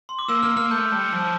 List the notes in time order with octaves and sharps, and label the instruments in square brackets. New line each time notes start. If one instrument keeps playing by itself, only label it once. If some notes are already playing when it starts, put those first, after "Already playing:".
[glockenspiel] C6
D6
[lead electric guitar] A#3 [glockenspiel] E6
[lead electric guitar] A#3 [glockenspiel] F6
[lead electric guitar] A#3 [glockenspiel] F6
[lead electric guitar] A3 [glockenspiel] G6
[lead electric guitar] G3
F3